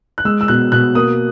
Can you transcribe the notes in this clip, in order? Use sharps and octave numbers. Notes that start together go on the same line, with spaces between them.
F#6
G#3 E6
E6
B2 F#6
B2 F#6
A#3 D#6